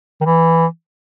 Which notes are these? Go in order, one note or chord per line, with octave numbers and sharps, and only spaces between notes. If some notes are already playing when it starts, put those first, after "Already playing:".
D#3
E3